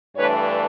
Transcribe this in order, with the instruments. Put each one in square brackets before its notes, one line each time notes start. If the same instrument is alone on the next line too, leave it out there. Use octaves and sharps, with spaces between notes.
[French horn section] G2 E3 A3 D4 B4 C#5